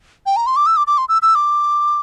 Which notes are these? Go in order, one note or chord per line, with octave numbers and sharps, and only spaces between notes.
G5
A#5
C6
D6
E6
D6
D6
C6
E6
E6
D6